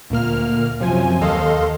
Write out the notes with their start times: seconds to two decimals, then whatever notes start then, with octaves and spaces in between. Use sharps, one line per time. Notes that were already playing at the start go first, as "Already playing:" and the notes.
0.10 D2 A#2 A#3 F6
0.80 F#2 C3 F3 F#3 C5 G#5
1.21 D#2 A4 D#5 F5 C6